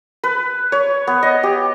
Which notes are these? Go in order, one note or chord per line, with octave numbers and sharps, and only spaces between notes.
B4
C#5
B3
D#5
G4